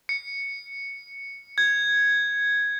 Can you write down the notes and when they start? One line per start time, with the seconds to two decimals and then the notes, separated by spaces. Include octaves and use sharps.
0.09 C#7
1.58 G#6